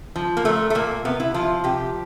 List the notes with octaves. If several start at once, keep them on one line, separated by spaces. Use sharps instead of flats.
F3
A#3
A#2 A3
A3
A#2 A#3
C3 B3
E4
F3 F4
C3 G4